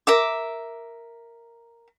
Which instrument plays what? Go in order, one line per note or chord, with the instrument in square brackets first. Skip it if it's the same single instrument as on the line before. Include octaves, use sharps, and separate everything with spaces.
[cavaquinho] A#4 E5 D6